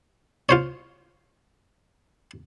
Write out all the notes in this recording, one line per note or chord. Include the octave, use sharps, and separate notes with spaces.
F4 C5 C#5